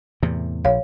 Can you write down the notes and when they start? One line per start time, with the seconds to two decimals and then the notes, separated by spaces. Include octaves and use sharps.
0.23 E2 A2 C3
0.65 A#1 C#5 F5